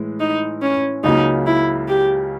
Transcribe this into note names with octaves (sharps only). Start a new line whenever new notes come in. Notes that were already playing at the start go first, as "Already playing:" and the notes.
Already playing: A2 E3 G#3
D#4
C#4
C#2 C#3 F#3 A#3 D#4
E4
G4